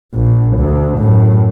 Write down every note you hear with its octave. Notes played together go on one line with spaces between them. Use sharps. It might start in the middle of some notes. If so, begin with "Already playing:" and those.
A#1
D2
F#2 A2